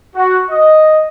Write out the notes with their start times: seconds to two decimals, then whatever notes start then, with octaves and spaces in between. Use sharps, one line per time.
0.15 F#4
0.49 D#5